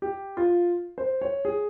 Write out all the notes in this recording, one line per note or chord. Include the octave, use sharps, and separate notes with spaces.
G4
F4
C5
C#5
G#4